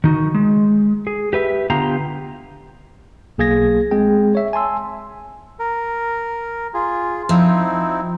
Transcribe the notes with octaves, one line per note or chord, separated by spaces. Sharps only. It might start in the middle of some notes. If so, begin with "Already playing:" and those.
D#3 D#4 F#4
G#3
G#4
G4 B4 E5
D3 B3 F4 G4 F5 A#5
B1 A#3 G#4 F5 G#6 A#6
G#3 C4 G#4 G5
C#5 E5
G#5 A5 C6 E6
A#4
F4 G#4
F3 C4 D#4 E4